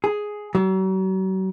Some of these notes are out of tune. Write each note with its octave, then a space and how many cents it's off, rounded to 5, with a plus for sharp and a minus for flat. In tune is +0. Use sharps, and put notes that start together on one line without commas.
G#4 +5
F#3 +40